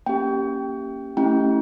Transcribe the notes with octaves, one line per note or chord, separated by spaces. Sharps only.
A#3 C#4 G4 G5
A3 C#4 E4 G4 G5